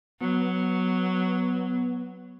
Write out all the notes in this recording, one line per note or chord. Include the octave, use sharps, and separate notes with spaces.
F#3 B3